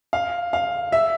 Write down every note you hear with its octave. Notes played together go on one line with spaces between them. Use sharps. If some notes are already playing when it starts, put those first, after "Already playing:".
F5
F5
E5